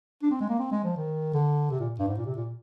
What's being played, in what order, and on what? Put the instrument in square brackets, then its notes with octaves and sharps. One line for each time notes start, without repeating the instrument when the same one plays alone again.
[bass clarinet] D4
C4
G#3
A#3
C4
G#3
F3
D#3
D3
C3
A#2
G2
G#2
A#2
C3
A#2